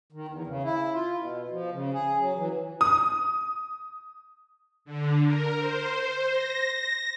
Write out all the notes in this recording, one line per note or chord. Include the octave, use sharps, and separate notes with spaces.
D#3
E2
C#3
E4
F4
B2
F3
C#3
G#4
F#3
E3
D#6
D3
A#4
C5
A#6